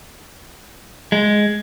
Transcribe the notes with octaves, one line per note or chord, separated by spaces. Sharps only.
G#3